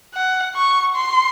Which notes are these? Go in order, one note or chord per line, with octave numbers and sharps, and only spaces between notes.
F#5
C#6
C6